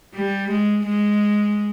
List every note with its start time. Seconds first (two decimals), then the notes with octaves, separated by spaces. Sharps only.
0.15 G3
0.50 G#3
0.86 G#3